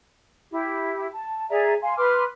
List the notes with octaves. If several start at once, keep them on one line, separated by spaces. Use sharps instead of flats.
E4 G4
A5
G#4 D5 E5 A#5
F5 G#5 C6
B4 C6 D6 F6